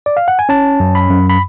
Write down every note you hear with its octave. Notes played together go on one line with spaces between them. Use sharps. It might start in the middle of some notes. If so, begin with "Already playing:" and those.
D5
F5
F#5
G#5
C#4 A5
F#2
B5
F#2
B5